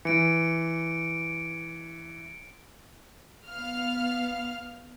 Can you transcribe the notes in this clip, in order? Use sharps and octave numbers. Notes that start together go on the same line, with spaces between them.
E3 C#7 D7
B3 F5 F6